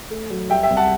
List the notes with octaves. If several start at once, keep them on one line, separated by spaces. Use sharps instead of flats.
A3
F#3
G3 E5 G5
E5 G5
C2
F#5 A5